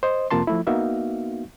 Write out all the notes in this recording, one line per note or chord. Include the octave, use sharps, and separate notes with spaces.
C5 D#5
F2 C3 A#3 F4 A5 C6
F3 A3 E4
A#3 B3 D#4 F#4 E5 F5